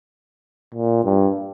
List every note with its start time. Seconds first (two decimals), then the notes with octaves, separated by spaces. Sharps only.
0.74 A#2
1.04 G2